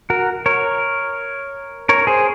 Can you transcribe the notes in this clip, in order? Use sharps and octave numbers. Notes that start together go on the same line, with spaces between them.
F#4 A#4
A#4 C#5
A#4 C#5
G#4 C5